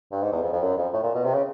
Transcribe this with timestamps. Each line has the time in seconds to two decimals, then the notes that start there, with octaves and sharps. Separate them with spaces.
0.12 G2
0.22 G#2
0.32 E2
0.42 F2
0.52 F2
0.63 F#2
0.77 F2
0.93 A2
1.03 A#2
1.14 B2
1.24 C3
1.34 C#3